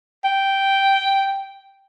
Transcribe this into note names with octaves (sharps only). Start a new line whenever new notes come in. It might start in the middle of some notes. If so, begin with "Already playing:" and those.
G5